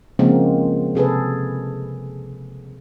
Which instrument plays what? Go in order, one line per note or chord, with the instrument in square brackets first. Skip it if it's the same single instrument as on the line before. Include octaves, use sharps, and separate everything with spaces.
[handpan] C#3 F3 G#3 A#3 C4
C3 G#4 A4 B4